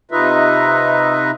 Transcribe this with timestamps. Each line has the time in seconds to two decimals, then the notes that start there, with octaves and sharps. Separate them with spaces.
0.11 C3 D#4 F4 B4 D#5 E5